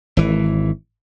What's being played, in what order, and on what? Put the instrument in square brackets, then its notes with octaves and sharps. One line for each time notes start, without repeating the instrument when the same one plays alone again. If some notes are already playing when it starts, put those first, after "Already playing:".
[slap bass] G#1 E3